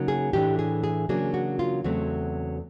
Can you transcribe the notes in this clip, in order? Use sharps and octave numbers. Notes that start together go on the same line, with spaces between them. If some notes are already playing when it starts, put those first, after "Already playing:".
Already playing: C#3 F#3 A#3 D#4
G#4
A2 E3 A3 D4 G4
G#4
G#4
C#3 F#3 A#3 D4 G#4
F#4
F4
E2 C#3 F#3 A3 C4 F#4